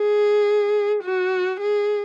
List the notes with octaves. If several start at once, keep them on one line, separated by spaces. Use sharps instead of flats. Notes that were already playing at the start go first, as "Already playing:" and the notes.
Already playing: G#4
F#4
G#4